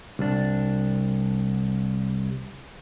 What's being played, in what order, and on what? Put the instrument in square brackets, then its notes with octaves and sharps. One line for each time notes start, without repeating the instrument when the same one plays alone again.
[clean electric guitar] C2 D4